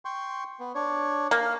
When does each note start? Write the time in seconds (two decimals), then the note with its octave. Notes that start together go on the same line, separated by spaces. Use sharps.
0.05 G5 C6 C#6
0.60 B3
0.75 D4 C#5
1.31 A#3 F5